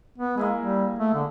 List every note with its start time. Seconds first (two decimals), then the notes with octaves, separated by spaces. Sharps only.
0.18 B3
0.37 G#3 A#3 E4 G#4
0.60 G3
0.99 A3
1.14 D3